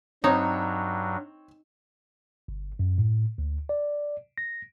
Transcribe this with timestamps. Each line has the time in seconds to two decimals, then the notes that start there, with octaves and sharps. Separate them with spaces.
0.24 G2 F#3 C4 D#4 C#5
2.48 G1
2.79 F#2
2.98 A2
3.38 D2
3.69 D5
4.38 A#6